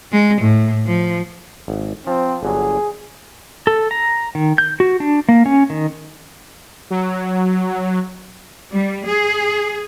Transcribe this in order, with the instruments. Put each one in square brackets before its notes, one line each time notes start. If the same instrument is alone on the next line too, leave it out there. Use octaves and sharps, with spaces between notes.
[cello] G#3
A2
F3
[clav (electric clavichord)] G#1
[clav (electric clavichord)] F3 [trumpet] C4
[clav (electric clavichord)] G1 D3 F#3 [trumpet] G#4
[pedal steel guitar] A4
A#5
D#3
G6
F#4
D4
A#3
C#4
D#3
[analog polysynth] F#3
[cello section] G3
G#4